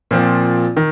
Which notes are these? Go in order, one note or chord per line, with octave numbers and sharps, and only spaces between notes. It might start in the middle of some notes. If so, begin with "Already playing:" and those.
A#2 F3 C4
D#3